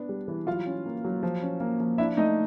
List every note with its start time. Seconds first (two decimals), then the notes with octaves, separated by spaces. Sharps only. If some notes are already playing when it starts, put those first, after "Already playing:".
Already playing: B3 D4
0.09 G3
0.28 E3
0.47 F#3 F4 F5
0.67 C#4
0.86 A#3
1.05 F#3
1.23 F3
1.42 C#4
1.60 A#3
1.80 F3
1.98 D4 E4 E5
2.17 A3 D#4 D#5